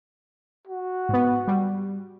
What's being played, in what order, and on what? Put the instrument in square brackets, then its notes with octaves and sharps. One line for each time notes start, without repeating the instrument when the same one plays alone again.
[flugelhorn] F#4
[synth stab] G#2 B3
G3